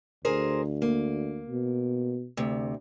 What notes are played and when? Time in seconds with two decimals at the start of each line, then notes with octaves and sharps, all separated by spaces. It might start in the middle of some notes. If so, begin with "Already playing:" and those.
0.25 D2 G#4 A#4 C5
0.82 A#3
1.49 B2
2.37 D2 C3